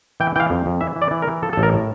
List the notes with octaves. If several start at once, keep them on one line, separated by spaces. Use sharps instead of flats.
E3 G5
E3 F5 G5
F2
F2
E3 E5
E3
D5
E3
A#4
E3
F3 A4
A4
A1
A#4
A2